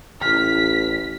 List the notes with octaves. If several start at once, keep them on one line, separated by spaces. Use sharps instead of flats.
A1 F6 B6